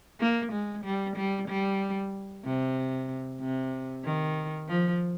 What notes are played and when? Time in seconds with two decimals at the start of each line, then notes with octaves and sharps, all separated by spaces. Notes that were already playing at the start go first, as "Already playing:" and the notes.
0.20 A#3
0.52 G#3
0.84 G3
1.16 G3
1.48 G3
2.45 C3
3.40 C3
4.05 D#3
4.68 F3